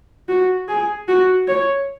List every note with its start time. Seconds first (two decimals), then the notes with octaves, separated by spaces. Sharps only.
0.29 F#4
0.68 G#4
1.08 F#4
1.48 C#5